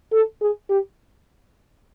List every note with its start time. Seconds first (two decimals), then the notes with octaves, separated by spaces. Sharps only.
0.12 A4
0.41 G#4
0.70 G4